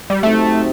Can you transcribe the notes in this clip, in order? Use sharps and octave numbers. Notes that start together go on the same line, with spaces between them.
G3
C3 F#3 A3 C4 D#4